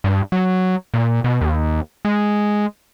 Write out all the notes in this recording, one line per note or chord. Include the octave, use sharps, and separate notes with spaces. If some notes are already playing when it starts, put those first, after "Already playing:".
G2
F#3
A#2
B2
D#2
G#3